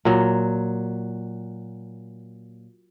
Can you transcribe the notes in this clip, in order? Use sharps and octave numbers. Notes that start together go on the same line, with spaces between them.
A#2 F#3